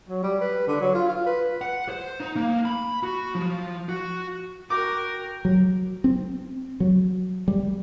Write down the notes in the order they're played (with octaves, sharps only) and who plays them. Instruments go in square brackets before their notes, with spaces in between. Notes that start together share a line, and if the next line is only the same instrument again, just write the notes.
[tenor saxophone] F#3
G3
B4
D3
F#3
F4
F4
B4
[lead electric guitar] F#5
C5
D#4
A#3
B5
F#4
F3
F#4
[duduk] F#4 [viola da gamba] A#4 [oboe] G5 [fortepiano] D6
[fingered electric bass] F#3
C4
F#3
G3